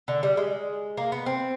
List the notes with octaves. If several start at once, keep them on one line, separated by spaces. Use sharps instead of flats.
D3
G3
G#3
A#3
B3
C4